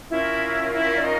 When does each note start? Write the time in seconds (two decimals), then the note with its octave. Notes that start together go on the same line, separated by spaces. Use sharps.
0.10 C#4 E4 F4 A#4 E5
0.71 E4 E5
0.96 D5
1.02 D#4 D#5